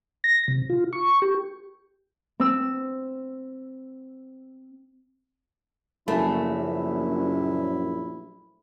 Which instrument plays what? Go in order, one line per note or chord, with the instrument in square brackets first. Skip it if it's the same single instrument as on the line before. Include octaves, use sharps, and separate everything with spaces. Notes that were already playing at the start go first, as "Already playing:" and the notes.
[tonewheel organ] A#6
C3
F4
C#6
G4
[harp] C4 E6
[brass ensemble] A#1 F#2 [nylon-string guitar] C#3 F#3 A#3 [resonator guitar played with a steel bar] A3 [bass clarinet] E4